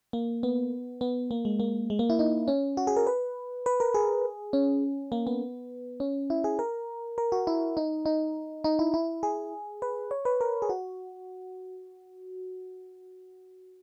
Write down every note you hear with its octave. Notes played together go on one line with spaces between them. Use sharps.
A#3
B3
B3
A#3
G#3
A#3
G#3
A#3
E4
D#4
C#4
F#4
G#4
A#4
B4
B4
A#4
G#4
C#4
A#3
B3
C#4
E4
G#4
A#4
A#4
F#4
E4
D#4
D#4
D#4
E4
E4
G#4
B4
C#5
B4
A#4
G#4
F#4